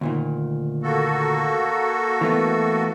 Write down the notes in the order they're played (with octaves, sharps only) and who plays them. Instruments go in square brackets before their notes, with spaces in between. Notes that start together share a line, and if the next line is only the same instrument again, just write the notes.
[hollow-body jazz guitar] D2 A#2 D#3
[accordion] A#3 F#4 A4
[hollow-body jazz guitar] E3 A3 B3